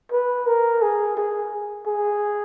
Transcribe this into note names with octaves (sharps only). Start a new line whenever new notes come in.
B4
A#4
G#4
G#4
G#4